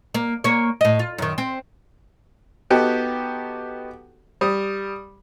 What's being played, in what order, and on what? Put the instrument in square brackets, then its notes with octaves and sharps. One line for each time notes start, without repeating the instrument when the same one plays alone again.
[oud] A#3
A#3 C#5
A2 D#5
F4
F#2 D#3
C4
[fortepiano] B3 D#4 F#4 G4 A4
G3 D#6